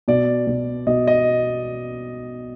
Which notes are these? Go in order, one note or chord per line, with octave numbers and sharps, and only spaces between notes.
B2 D5
B2
B2 D#5
D#5